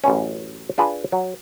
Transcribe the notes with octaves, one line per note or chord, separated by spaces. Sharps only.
A1 F#2 E3 C#4
D4 F4 G#4 B4
F#3